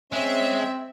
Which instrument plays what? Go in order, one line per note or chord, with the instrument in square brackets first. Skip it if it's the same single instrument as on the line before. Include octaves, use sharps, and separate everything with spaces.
[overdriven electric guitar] G#3 [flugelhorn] C4 [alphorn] C#4 [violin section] E5